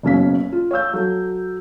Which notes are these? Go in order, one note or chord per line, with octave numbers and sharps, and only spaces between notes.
F#1 F#2 B2 C#4 F5 B6
F4
C#5 F5 E6 G6
F#3 A4